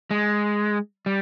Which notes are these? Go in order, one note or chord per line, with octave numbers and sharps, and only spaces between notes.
G#3
G3